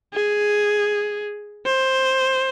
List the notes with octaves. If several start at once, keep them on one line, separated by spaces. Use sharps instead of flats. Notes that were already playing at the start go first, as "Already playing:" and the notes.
G#4
C5